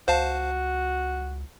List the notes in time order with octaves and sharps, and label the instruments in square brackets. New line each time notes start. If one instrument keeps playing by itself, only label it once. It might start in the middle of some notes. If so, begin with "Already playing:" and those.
[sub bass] C#2 [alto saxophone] F#4 [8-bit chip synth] C5 F5 A5